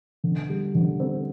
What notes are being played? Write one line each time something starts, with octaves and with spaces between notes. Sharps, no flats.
D3
G3
D3
C4